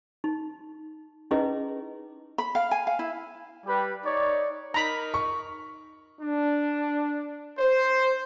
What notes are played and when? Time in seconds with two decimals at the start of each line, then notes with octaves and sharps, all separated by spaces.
0.24 D#4
1.31 C#4 D#4 E4 G#4 B4 D#5
2.38 B5
2.55 F5
2.71 G#5
2.87 F5
2.99 E4
3.66 G3 G4 B4 B5
4.04 D#4 C#5 D5
4.74 D#4 A#4 A#5 B5
5.14 C#6
6.21 D4
7.58 C5